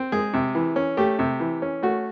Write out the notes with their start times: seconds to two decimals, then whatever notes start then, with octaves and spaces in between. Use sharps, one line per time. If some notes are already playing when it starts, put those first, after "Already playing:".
Already playing: C4
0.12 G#3 G#4
0.34 C3
0.55 E3
0.76 C#4
0.97 A3 G4
1.19 C3
1.40 E3
1.62 C#4
1.82 A3 F#4